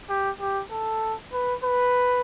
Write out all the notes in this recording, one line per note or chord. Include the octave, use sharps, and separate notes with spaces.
G4
G4
A4
B4
B4